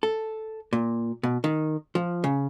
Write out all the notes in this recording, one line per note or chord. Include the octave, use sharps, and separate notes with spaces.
A4
A#2
B2
D#3
F3
C#3